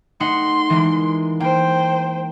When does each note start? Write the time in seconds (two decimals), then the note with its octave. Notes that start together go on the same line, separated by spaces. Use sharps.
0.20 A3 D#4 F#5 C6
0.70 E3 G#3 A#3
1.40 A#3 C5 G5